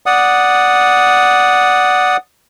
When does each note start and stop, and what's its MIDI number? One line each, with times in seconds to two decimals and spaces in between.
0.06 2.17 74
0.06 2.17 78
0.06 2.17 87